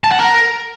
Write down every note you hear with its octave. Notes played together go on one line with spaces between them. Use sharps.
A5
F#5
A#4